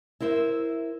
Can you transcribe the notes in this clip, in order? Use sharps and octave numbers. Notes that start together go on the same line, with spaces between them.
E4 A#4 C5 E5